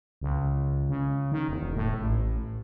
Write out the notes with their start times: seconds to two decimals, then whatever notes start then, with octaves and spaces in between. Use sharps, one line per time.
0.22 C#2
0.89 C#3
1.32 D#3
1.48 E1
1.76 A2
2.00 A1